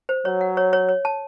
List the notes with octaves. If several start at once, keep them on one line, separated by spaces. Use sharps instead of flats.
C5
F#3 C#5
F#5
C#5
C#5
C#5
A5